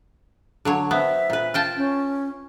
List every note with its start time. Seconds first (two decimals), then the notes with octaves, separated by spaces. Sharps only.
0.65 D3 F#3 C#5
0.91 B3 C4 E5
1.30 A#2 B4
1.54 F4 G5 A5
1.76 C#4